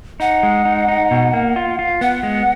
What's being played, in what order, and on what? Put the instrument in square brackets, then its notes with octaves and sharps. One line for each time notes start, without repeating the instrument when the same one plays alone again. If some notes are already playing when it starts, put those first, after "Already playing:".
[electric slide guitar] D#4 [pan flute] F#5
[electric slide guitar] G#3
D#4
D#4
B2
A#3
F4
F4
[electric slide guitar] B3 [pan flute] F#5
[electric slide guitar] G#3